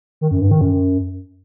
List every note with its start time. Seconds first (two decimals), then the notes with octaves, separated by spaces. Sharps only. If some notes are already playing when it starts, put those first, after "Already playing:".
0.21 D#3
0.31 F#2
0.41 G2
0.51 D#3
0.61 F#2